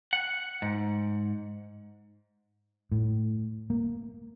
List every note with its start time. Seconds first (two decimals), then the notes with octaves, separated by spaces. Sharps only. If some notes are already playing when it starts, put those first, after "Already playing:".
0.13 F#5
0.62 G#2
2.92 A2
3.70 A#3